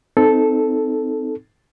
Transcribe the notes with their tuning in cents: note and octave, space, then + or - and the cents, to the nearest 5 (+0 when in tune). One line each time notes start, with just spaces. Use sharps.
C4 -15 D#4 +0 A4 -5